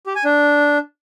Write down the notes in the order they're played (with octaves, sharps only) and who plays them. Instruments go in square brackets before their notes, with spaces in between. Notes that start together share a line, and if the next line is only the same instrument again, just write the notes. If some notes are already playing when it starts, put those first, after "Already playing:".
[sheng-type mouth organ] G4
G#5
D4